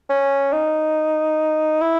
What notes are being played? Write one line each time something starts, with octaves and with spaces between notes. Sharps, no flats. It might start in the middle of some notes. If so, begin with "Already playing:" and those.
C#4
D#4
E4